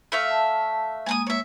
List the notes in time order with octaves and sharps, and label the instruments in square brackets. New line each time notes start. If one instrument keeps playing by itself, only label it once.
[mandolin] A3 E5 F5
[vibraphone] A5
[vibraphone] G#3 A#3 [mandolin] G#5 A5 D#6
[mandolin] C#5 E5